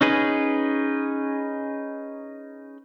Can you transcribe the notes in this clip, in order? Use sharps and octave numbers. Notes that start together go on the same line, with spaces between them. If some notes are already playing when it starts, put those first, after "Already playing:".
C#4 D#4 G#4 B4